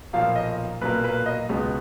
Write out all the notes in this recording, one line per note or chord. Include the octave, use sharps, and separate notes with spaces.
B1 A#2 F3 A#3 F5
D#5
B1 A#2 F#3 A#3 B4
B4
D#5
C#2 B2 G#3 B3